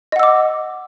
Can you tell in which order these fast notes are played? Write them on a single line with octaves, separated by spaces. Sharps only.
D#5 F#5 E6 D6